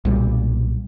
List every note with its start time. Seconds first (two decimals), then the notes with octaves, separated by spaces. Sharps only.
0.05 B1 A#2 G3